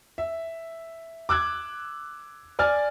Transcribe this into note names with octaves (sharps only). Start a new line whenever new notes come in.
E5
D6 E6 F#6 G#6
D5 G#5 F6 A6